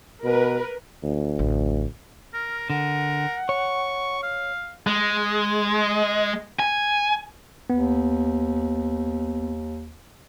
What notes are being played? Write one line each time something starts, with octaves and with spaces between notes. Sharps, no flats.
B2 A#4 B4
D2
A1
A#4 F6
D3 A#4 F#5
C#5 C#6
F5
G#3
G#5
D#2 B3